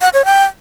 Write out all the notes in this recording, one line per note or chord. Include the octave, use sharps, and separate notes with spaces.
F#5
C#5
G5